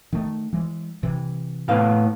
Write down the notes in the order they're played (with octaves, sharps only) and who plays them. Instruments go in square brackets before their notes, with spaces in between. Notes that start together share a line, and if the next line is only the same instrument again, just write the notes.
[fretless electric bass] D#3 A3
E3 G#3
C3 E3
[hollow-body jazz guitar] A2 B3 F5